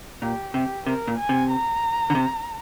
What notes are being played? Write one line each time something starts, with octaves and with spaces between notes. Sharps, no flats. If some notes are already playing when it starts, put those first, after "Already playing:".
A#2 G4
C3 G4
C3 A#4
A#2
G#5
C3
A#5
D3
C3